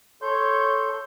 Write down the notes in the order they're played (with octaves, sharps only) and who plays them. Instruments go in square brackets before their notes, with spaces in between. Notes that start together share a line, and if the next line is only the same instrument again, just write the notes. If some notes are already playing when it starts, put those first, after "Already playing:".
[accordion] A4 C6 G6 [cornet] C#5